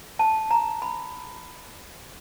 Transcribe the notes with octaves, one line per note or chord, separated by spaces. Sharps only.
A5
A#5
B5